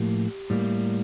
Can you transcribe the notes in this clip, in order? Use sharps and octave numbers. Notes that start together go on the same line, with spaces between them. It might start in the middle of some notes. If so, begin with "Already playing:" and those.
Already playing: A2 F3 A#3 G4
A2 G3 A#3